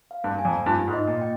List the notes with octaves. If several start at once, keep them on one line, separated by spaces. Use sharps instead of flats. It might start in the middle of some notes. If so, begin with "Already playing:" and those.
F5
G2
G#5
F2
G2 F4
G#2
D#5
A#2
G5